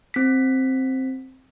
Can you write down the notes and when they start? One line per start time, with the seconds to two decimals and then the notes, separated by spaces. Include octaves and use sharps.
0.14 C4 B6